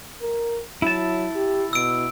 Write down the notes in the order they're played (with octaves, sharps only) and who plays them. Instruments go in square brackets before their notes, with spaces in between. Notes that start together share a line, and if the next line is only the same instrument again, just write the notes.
[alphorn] A#4
[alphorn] F#3 [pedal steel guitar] E4 A5
[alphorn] G4
[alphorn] B2 [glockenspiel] E6 D7